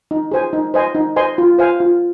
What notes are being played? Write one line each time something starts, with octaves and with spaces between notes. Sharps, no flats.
D#4
G#4 C5 G#5
D#4
C5 D#5 G#5 C6
D#4
C5 D#5 G#5 C6
F4
C5 F5 G#5
F4